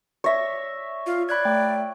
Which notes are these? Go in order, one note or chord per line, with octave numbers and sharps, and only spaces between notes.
C#5 D5 E5 A#6
F4
D5 B5 F#6 G#6
A3 G5